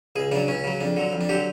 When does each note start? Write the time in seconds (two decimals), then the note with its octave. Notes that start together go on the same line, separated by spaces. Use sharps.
0.16 C#2 G#4
0.31 C#3 F#3 D4
0.48 C#2 C#4
0.64 C#3 F#3
0.81 F2 D4
0.97 D3 F#3
1.13 F2
1.21 D4
1.29 D3 F#3 G4